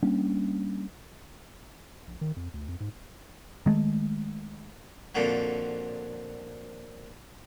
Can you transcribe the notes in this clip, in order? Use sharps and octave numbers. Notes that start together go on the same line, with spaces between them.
G3 A#3 C#4 D4
A#1
D#3
F2
D2
F2
G#2
D#3 G#3 A3
F2 A#2 D3 F#3